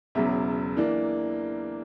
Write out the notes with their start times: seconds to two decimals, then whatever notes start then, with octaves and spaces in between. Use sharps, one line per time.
0.15 E1 E2 C#3 F#3 E5
0.77 E3 A#3 D4